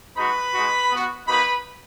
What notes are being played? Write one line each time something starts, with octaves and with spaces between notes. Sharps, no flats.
G#3 D#4 F#4 B4 B5
G#3 D#4 F#4
B3 F#4
A#3 D#4 F#4 B4 B5